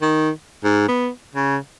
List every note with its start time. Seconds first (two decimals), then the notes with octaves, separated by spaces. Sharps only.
0.02 D#3
0.64 G#2
0.88 B3
1.35 C#3